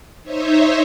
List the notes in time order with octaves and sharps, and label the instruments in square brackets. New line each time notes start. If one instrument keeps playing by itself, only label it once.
[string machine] D#4 C5 C#5 E5